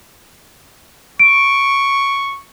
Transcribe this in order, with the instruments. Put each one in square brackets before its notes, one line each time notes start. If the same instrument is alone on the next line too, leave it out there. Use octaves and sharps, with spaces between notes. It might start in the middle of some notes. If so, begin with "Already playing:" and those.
[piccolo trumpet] C#6 [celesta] D7